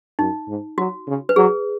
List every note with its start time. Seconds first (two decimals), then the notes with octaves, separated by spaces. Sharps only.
0.19 F#2 D#4
0.48 G#2
0.78 F#3 F#4
1.07 C#3
1.29 B4
1.36 F#3 G#4